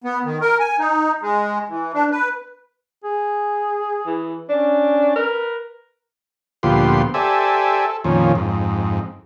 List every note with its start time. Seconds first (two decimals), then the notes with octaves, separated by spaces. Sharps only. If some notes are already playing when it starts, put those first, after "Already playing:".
0.04 B3
0.24 D#3
0.41 A#4
0.60 G#5
0.79 D#4
1.21 G#3
1.69 E3
1.94 D4
2.11 B4
3.04 G#4
4.06 E3
4.49 C#4 D4
5.16 A#4 B4
6.63 D2 A#2 F3 B3 G4 C6
7.14 G4 A4 C5 D5 E5 G#5
7.86 A4
8.04 F2 A#2 D#3 F3 C#4
8.35 F2 G#2